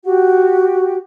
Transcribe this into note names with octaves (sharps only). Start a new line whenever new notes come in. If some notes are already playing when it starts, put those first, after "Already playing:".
F#4 G4 F#5